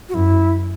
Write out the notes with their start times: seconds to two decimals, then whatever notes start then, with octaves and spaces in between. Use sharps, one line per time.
0.09 F#4
0.14 F#2 E4